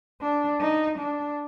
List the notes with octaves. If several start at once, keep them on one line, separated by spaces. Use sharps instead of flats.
D4
D#4
D4